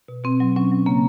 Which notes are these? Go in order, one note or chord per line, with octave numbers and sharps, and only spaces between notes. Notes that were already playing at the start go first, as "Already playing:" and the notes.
B2
B2 C4
F#3
F#3 C#4
F#3
C#3 A#3